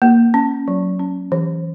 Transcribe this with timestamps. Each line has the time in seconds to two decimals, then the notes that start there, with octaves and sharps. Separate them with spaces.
0.02 A#3
0.34 C#4
0.68 F#3
1.00 C#4
1.32 E3